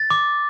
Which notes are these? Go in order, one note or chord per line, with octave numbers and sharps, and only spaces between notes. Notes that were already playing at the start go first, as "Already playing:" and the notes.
Already playing: A6
D6